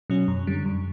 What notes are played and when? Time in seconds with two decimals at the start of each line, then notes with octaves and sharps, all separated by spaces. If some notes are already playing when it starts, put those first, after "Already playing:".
0.10 B2 F#3 C#4
0.28 F#2
0.47 D3 G3
0.65 F#2